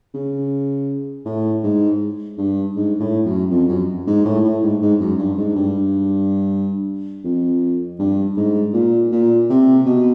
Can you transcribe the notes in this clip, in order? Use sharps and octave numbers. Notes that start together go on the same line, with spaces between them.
C#3
A2
G#2
G2
G#2
A2
F#2
F2
F#2
G#2
A2
A2
G#2
G#2
F#2
G2
G#2
G2
F2
G2
G#2
A#2
A#2
C3
B2